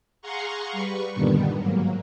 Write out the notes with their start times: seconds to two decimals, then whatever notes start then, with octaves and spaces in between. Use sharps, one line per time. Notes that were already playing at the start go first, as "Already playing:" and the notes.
0.22 G#4 F5 F#5 A#5 C6 C#6
0.72 G3 B4 C#6
1.14 G2 A#2 D3 D#3 G3 B3
1.56 G#2 F#3 A#3